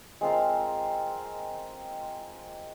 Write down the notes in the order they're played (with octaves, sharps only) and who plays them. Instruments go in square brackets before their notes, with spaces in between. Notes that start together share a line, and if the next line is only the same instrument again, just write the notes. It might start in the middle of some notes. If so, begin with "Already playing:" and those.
[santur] G#3 C4 F4 A#4